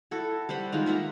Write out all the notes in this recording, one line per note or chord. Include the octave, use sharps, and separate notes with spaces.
E4 F#4 A4
G3 C5 F#5 B5
D#3 G#3 D#4 F4
A#3 E5 F#5 A#5